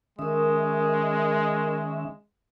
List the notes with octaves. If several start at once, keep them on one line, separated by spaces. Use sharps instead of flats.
D#3 G#3 C#4 A#4 E5 D#6